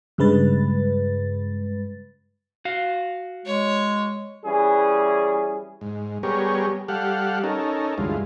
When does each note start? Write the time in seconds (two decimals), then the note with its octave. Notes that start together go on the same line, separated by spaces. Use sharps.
0.18 G2 C#3 G#3 B4 A6
2.65 F#4 F5
3.46 G#3 C#5
4.44 E3 G3 C#4 G#4
5.81 G#2
6.23 G3 B3 G4 G#4 A#4 C#5
6.88 G3 G4 A4 F5 F#5
7.44 C#4 D#4 A4 A#4
7.98 D2 G2 E3 G#3 F4